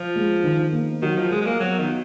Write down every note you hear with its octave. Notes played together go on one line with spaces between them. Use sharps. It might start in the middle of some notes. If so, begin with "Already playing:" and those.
Already playing: F3 F4
G#3
D#3
A#3
D#3 F#3
F3
G#3 A#4
G#3
A#3
F#3 B3
D#3
F#4